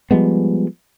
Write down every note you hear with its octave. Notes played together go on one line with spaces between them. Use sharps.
F3 G3 G#3 B3